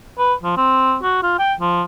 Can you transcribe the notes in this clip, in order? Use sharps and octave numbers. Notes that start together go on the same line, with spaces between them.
B4
F3
C4
F#4
F4
G5
F3